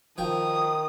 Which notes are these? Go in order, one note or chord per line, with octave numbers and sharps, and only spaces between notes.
D#3 F3 G5 D#6